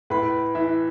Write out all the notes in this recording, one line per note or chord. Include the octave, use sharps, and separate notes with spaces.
A2 B4 B5
E3 E5